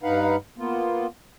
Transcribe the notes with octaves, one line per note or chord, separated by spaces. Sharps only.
G2 D#4 B4 F5 F#5
A#3 B3 F4